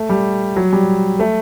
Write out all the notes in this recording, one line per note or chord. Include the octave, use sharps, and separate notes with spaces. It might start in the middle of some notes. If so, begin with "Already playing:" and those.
Already playing: A3
G3
F#3
G3
A3